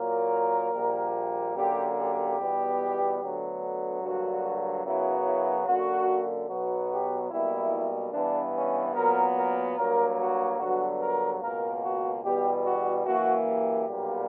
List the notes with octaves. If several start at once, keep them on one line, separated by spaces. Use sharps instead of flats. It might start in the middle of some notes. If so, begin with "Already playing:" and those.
Already playing: A#2 F#3 A#3 A#4
A#1 A#2 G3 A#3
F#2 D3 A#3 G4
G4
E2 B2 G3 B3
D2 D3 F#3 B3
G2 D3 F#3 A#3 F#4
F#2 C#3 F#3 B3 E4
E4
F#2 D3 A#3 F#4
B1 B2 F#3 B3 F#4
G4
B1 B2 G3 A#3 E4
G2 E3 B3 D4
C#4
A#2 F#3 B3 A#4
A#4
G2 F#3 A#3 A#4
F#4
G2 D3 F#3 B3 F#4
A#4
C#2 B2 A#3 A#4
F#4
E2 B2 G3 B3 G4
F#4
F#2 E3 A#3 F#4
G4
B1 A#2 G3 A#3